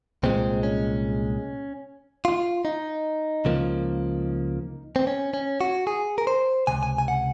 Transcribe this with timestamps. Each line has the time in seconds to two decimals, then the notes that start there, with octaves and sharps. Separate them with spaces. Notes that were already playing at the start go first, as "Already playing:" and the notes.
0.23 C2 A#2 G#3 C4
0.63 C#4
2.25 F4
2.65 D#4
3.45 C#2 C#3 F3 A#3
4.96 C4
5.07 C#4
5.34 C#4
5.61 F#4
5.87 G#4
6.18 A#4
6.27 C5
6.67 C#2 C3 G#5
6.83 G#5
6.98 G#5
7.08 F#5